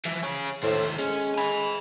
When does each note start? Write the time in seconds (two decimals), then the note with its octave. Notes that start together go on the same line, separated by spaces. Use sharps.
0.05 E3 F3
0.23 G#4 C#5
0.63 D#2 A2 C5
0.98 G#3 C#4
1.34 G#5 B5